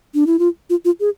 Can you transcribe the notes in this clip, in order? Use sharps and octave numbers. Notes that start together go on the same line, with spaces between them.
D4
E4
F4
F4
F4
G#4